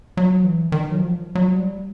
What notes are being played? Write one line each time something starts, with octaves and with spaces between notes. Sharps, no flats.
F#3
E3
D#3
F#3
F3
F#3
G3